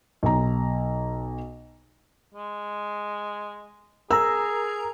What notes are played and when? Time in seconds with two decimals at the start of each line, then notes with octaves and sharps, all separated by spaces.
0.23 B1 A#5
2.35 G#3
4.11 G#4 A#4 A#5 E6